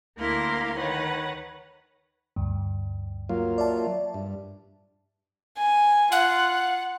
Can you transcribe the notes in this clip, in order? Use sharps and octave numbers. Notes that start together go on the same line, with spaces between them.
D2 A#3 E4 A#4 F5 C6
D#3 B4 C#5 F#5
D2 G2
F#3 A#3 F4
D5 E5 A5
G2
G#5
F4 F#5